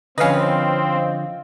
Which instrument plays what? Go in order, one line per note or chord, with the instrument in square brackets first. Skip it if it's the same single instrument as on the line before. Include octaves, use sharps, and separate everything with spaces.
[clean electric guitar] D3 F3 [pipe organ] C4 [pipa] C#4 B4 [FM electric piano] D#5 F5